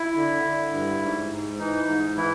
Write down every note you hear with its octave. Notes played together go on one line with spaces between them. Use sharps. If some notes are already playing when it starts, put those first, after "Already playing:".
Already playing: E4
D3
D3
G2
G#2
G#2
E3 D#4
G#2
E3 E4